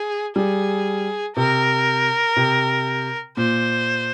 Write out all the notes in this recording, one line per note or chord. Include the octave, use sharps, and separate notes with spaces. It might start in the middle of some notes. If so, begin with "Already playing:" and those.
Already playing: G#4
G3 G#4
C3 A#4
C3
A#2 C5